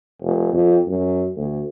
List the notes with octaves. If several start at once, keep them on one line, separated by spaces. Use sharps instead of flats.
F1
F2
F#2
D2